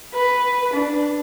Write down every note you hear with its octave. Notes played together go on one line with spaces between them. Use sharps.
B4
D4